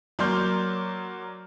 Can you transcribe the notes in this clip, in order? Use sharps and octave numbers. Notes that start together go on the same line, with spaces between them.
F#3 A#3 D5 C6 F6 G6